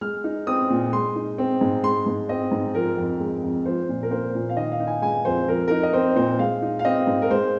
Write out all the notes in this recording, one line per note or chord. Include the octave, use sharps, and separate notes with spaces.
G#3 F6
D#4
C4 D#6
A#2
G#3 C6
D#4
C4
G#2
G#3 C6
G#2
C4 D#5
G#2
F3 A#4
F2
G#3
F2
F3 C5
A#2
A#4
A#3 C5
A#2
F5
D#3 D#5
F5
D#4
G#5
G#3 G#5
F2 C5
F3 A#4
D#4 A#4
D#5
C4 C5
A#2 C5
G#3 F5
D#4
F5
C4 D#5
G#2
A#4
G#3 C5